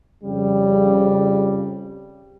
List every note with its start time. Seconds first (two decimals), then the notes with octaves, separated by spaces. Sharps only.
0.23 F2 C#3 G3